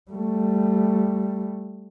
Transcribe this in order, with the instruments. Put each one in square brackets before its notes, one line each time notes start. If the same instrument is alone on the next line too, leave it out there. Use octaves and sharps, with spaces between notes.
[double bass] G3 A3